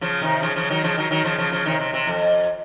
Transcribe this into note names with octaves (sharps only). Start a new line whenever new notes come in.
C#3 F3
C3 D#3
C#3 F3
C#3 F3
D#3 F#3
C#3 F3
D#3 F#3
D#3 F#3
C#3 F3
C#3 F3
C#3 F3
C3 D#3
C3
C3
F2